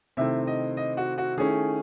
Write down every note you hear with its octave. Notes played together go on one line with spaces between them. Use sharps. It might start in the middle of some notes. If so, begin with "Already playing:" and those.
C3 D#3 A3 C4 E4 E5
D#5
D#5
F#4
F#4
D#3 A3 C#4 E4 G#4